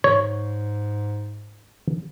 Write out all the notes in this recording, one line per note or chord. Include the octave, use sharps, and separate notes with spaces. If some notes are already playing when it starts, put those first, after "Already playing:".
G#2 C#5